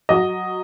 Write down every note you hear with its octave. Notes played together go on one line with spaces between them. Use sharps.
F#3 D#5